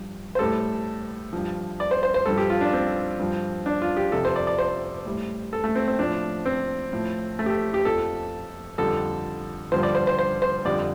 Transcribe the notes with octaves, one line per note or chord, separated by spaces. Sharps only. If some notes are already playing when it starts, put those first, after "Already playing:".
Already playing: G2 F3
C5
A2 G3 A4
G2 F3
D5
C5
C5
C5
G2 F3 A4
G4
F4
D4
C4
G2 F3
D4
F4
G4
F2 C3 F3 A4
C5
D5
D5
C5
A2 G3
A4
A3
C4
C4
A2 F3 D4
C4
A2 F3
A3
G4
A4
G4
F2 F3 A4
F2 D3 G3 A4
G2 D3 F3 C5
D5
C5
C5
C5
C5
F2 D3 G3 D5